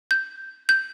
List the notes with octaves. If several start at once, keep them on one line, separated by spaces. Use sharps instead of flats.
G6
G6